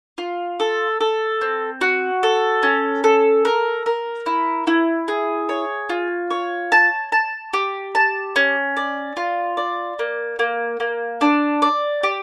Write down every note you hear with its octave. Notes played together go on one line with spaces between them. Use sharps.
F4
A4
A4
C4
F#4
A4
C#4
A4
A#4
A#4
E4
E4
G#4
C#5
F4
C#5
A5
A5
G4
A5
C#4
D5
F4
D5
A#3
A#3
A#3
D4
D5
G4